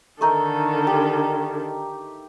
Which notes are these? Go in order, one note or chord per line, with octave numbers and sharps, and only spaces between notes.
D3 D#3 A3 D#4 A4 A#4
G4